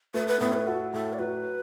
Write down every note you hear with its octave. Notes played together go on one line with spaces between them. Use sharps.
A3 B4
B4
A2 B3
B4
F#4 A4
A2 A4
D5
F#3 B4